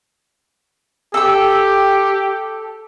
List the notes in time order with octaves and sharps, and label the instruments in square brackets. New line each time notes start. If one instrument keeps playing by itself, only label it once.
[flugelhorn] G4 [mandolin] A4 E6